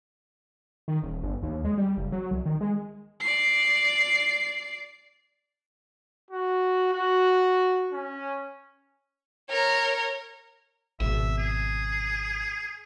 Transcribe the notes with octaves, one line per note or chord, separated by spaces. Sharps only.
D#3
D#1
G1
D#2
G#3
G3
F#1
F#3
C2
D#3
G#3
D5 C7
F#4
F#4
C#4
A#4 C#5
G#1 B2 E5
G#4